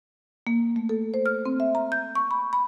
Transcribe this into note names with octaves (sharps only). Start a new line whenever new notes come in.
A#3
A3
A4
C5
F6
C4
E5
A#5
G6
C#6
B5
B5